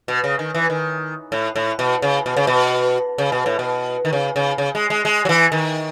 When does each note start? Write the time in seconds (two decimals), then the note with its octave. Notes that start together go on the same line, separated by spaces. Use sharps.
0.08 B2
0.24 C#3
0.39 D#3
0.54 E3
0.70 D#3
1.32 A2
1.56 A2
1.79 B2
2.02 C#3
2.26 B2
2.37 C#3
2.47 B2
3.18 C#3
3.32 B2
3.46 A2
3.59 B2
4.05 D#3
4.13 C#3
4.36 C#3
4.58 C#3
4.75 G#3
4.90 G#3
5.05 G#3
5.25 F#3
5.29 E3
5.52 D#3